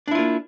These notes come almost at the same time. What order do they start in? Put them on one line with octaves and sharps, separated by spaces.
D4 E4 F4 A#3